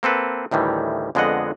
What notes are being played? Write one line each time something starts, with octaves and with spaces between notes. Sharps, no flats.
A#3 C4 A4 B4
D2 A2 D#3 E3 G3
F2 D3 G#3 B3 D#5 F#5